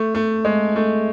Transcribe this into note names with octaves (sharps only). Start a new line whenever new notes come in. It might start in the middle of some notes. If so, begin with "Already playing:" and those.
Already playing: A3
A3
G#3
A3